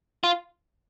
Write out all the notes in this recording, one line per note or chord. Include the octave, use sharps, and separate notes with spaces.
F4